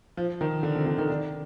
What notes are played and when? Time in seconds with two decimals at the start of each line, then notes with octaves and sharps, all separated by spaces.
0.17 F3
0.41 D#3
0.63 D3
0.75 C3
0.86 D3
0.98 D#3
1.10 D4